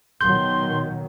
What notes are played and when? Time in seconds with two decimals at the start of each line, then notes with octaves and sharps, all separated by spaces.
0.21 B2 D#3 F#3 C6 G6